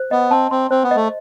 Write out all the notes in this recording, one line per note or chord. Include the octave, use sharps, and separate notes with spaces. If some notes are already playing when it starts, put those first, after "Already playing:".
Already playing: C5
B3 D#5
C4 A5
C4 C6
C4 C5
B3
A3 D#5